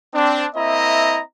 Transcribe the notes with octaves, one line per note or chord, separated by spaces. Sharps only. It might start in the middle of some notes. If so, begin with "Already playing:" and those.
C4 D4
A#3 C4 E4 D#5 E5 A#5